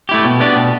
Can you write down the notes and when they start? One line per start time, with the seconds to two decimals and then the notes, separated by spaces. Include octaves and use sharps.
0.09 A3 E4 G4
0.25 B2
0.40 B3 D4 G4
0.56 B2